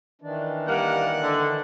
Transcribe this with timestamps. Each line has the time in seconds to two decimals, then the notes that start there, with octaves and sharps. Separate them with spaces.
0.22 D#3 E3 D4
0.68 G3 A#3 F#5
1.21 D3